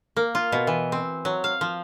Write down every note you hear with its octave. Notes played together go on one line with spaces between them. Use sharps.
A#3
F4
B2
E3
C4
F#3
F5
F3